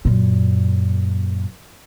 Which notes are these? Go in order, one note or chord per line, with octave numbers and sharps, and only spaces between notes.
F#2 A#2